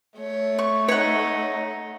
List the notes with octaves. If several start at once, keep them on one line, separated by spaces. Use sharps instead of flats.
A3 C#5
C#6
D#4 C#5 F#5